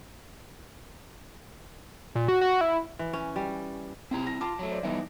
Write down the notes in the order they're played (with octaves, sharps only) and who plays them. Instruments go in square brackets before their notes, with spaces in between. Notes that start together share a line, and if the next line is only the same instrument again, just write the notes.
[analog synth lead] A#2
F#4
F#4
E4
[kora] E3
C#4
G3
[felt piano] C3 [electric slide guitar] C4 E4 A#5
[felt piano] A#6
[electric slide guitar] F4 [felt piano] A5 D6
[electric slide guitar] F#3 A3
[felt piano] C5 D5
[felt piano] E3 E4 [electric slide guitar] G3 B3 D#4